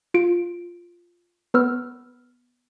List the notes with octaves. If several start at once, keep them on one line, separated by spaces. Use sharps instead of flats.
F4 D7
B3 B4 E6 F6